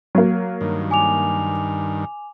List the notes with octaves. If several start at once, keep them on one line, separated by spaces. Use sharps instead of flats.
F#3 A#3
G2 D#3
G#5 D6 F7